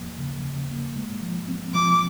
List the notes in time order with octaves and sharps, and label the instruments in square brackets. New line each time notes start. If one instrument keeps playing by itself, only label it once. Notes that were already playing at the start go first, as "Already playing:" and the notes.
Already playing: [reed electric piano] D#2 F3 A#3
C#3
C#3
A#3
G#3
F3
C4
[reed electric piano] F3 [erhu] D6